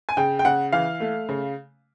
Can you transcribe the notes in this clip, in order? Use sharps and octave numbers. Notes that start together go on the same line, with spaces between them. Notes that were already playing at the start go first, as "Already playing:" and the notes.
G#5
C#3 G5
G5
C#3 F#5
E3 F5
A3
C#3